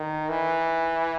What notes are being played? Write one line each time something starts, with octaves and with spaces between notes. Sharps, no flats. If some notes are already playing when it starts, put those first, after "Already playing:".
Already playing: D#3
E3